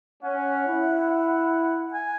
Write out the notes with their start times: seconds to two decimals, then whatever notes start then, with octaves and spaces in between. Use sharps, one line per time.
0.23 C#4 F#5
0.66 E4
1.94 G#5